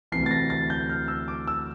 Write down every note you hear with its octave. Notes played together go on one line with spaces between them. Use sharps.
D2 C3 E3 C7
A6
A#6
A6
G6
F6
E6
D6
E6